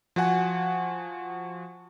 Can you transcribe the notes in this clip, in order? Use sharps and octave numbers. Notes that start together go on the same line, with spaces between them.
F3 F#4 F#5 G#5